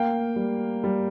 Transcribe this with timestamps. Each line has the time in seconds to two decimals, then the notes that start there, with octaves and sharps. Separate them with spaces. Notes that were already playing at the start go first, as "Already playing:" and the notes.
Already playing: A#3 F5 G5
0.36 G3
0.84 G3